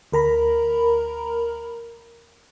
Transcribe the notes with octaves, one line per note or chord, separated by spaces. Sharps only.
D2 A#4 A#5 B5